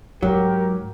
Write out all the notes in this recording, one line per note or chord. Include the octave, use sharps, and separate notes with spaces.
G#2 F#3 G4 A#4